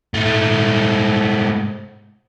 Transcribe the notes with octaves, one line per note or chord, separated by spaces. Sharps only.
G#2 A3